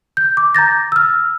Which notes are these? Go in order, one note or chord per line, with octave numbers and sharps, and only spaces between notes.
G6
D6
A#5 G6 A6 A#6
E6 F6